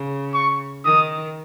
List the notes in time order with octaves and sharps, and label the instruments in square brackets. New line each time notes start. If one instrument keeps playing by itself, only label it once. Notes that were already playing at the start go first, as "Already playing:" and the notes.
Already playing: [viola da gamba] C#3
[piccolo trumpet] C#6
[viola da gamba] D#3 [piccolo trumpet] D#6